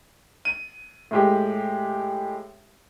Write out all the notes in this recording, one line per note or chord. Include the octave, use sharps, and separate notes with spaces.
D#7
A2 G#3 G4